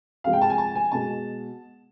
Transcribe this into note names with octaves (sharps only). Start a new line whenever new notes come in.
C3 F3 G#3 F5
G5
A5
G#5
A5
G#5
B2 G#3 A5